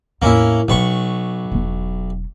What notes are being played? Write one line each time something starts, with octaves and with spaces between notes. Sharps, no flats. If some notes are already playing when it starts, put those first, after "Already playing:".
E2 A2 A#3 C#4 E4
B1 B2 F4 B4 C#6
E1 F#3